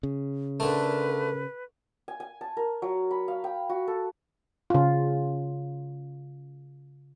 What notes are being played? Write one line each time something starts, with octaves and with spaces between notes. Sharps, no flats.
C#3
D3 A3 A#4 B4
G#5
G#5
A5
A#4
F#3
B5
F5
G5
F#4
A4
C#3 F4